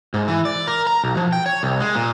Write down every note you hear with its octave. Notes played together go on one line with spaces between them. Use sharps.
G#2
E3
D5
A#4
A#5
B1
F3
G5
C#5
C2
G#3
A#2